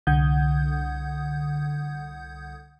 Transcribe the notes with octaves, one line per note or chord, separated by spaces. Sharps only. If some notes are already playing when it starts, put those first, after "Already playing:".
C2 D3 F#5 D#6 G6 G#6